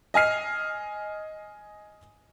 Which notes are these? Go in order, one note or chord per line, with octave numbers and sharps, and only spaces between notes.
D#5 G#5 F6 C7